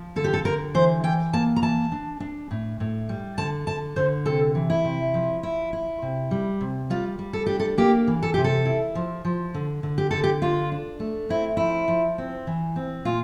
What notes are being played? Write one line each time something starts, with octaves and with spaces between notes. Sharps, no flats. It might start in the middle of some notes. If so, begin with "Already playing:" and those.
Already playing: F3
D3 A4
G4
A4
D3 A#4
E3 C5
E3 G5
A#3 A5
A#5
E3 A5
D4
D4
A2
A2
G3
D3 A5
D3 A5
D3 C5
C3 A4
E3
E4
C3
F3
E4
E4
C3
G3
C3
G3 F4
G3
A4
D4 G4
A4
A#3 G4
E3
A4
C3 G4
A4
E4
F3
F3
D3
D3
G4
D3 A4
G4
D4 F4
D4
A3
C4 E4
F3 E4
F3
C4
E3
C4
A#2 F4